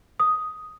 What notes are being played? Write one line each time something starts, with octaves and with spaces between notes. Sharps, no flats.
D#6